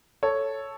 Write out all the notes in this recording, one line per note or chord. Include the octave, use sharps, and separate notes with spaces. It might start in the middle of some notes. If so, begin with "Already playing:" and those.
A4 C#5